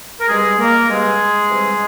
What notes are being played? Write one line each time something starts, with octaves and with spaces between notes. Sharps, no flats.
A#4
G2 G3 G#3 C4 G#4
A#3 A#4
G2 G3 G#3 C4 G#4
C3 E3 G3 C4